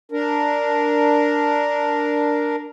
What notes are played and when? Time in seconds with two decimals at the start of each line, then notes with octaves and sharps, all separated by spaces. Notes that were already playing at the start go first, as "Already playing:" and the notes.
0.12 D4 A#4